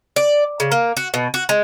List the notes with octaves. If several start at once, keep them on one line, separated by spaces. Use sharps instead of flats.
D5
C#3
A#3
F#4
B2
F#4
G#3